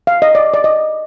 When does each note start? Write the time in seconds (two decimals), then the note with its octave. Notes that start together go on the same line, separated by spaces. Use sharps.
0.07 F5
0.22 D#5
0.35 D5
0.54 D5
0.64 D#5